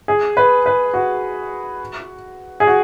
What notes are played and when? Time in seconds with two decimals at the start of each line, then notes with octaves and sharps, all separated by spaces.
0.08 G#4
0.37 B4
0.66 B4
0.94 F#4
2.60 G#4
2.67 F#4